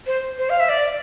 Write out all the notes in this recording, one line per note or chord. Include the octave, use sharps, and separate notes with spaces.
C5
C5
F5
E5
D5